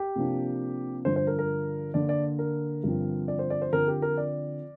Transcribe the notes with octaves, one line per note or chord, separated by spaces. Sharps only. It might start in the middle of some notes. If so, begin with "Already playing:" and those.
Already playing: G4
C3 F3 A#3 D4
G2 D3 F3 D4 C5
C5
A#4
A#4
D3 A#3 D4 D5
D5
A#4
G2 D3 F3 C4
D5
C5
D5
C5
D3 F3 C4 A#4
G4
A#4
D5